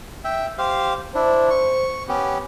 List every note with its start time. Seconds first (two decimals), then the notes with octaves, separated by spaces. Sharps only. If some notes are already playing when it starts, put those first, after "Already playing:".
0.24 E5 G5
0.58 G4 C5 F5
1.15 D4 E4 C5
1.50 C#6
2.09 B3 C#4 G4